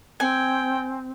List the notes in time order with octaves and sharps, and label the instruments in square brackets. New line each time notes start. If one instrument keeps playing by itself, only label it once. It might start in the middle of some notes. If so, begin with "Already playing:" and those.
[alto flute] C4 [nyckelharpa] G5 [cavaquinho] G#5